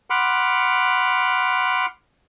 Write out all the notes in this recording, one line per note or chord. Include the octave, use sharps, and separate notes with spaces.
F#5 B5 C6 D6 F6